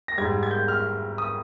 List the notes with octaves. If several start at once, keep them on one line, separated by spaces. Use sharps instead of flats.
A#6
G#2 G3 G#6
G#6
G6
F6
D#6